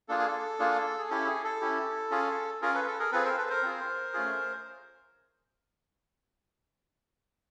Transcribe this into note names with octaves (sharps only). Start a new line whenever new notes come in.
A#3 D4 F4 G#4 A4
G#4
A4
A#3 D4 F4 G#4
G#4
C#4 E4 G4 A4
G#4
A4
C#4 E4 G4
C#4 F4 G#4
C#4 F4 G#4 A#4
A4 B4
A4
G#4 A#4
C4 F4 G#4 A4 B4
A#4 C5
A4 B4
A#4 C5
C4 F4 G#4
A3 C#4 F4 G#4